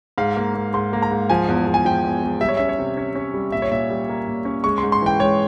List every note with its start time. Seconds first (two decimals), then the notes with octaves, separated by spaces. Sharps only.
0.18 G#2 F5
0.37 A#3
0.55 A#3
0.74 G#2 C6
0.93 A#3
1.02 A#5
1.11 G#2
1.30 F3 G#5
1.48 E2
1.67 E2
1.74 G#5
1.85 F3 G5
2.04 E2
2.23 E2
2.41 G3 E5
2.48 C#5
2.57 C#4 E5
2.69 C#5
2.79 C3
2.97 C#4
3.15 C#4
3.34 G3
3.52 A#2 E5
3.62 C#5
3.72 A#2 E5
3.90 G3
4.09 A#3
4.28 A#2
4.45 C#4
4.64 G#3 C#6
4.78 G#2 C6
4.92 C6
5.02 E3 G5
5.20 G#3 C#5